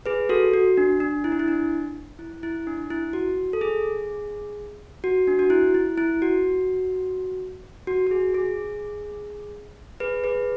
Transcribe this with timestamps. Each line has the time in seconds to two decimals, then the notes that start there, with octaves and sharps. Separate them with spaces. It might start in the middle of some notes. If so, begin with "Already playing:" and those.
0.06 G#4 B4
0.29 F#4 A4
0.54 F#4
0.77 D4
1.00 D4
1.24 E4
1.32 D4
1.39 E4
1.48 D4
2.19 E4
2.43 E4
2.67 D4
2.90 E4
3.13 F#4
3.53 A4
3.61 G#4
5.04 F#4
5.27 D4
5.39 F#4
5.50 E4
5.75 E4
5.98 E4
6.22 F#4
7.87 F#4
8.07 F#4
8.11 G#4
8.35 G#4
10.00 G#4 B4
10.24 G#4 B4